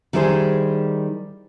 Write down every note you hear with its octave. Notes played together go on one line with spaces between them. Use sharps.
D#3 G3 E4 G#4 C5